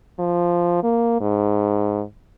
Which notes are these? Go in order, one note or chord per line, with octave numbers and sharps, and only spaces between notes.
F3
A#3
G#2